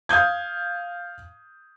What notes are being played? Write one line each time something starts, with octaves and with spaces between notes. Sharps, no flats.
F5 D#6 G6 G#6